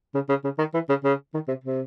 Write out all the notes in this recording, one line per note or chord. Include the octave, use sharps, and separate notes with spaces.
C#3
C#3
C#3
D#3
E3
C#3
C#3
D#3
C3
C3